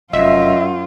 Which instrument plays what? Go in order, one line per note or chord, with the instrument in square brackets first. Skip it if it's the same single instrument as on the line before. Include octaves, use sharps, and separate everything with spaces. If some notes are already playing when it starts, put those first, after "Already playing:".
[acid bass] F1 [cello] F#2 F4 [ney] D#5 [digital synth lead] E5